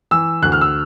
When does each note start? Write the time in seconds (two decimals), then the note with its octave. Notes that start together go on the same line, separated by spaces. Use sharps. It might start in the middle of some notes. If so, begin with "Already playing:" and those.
0.11 E3 E6
0.42 D2 F#6
0.52 F6
0.61 E6